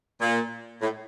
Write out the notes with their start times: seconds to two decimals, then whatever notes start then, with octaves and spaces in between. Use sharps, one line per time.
0.21 A#2
0.82 A2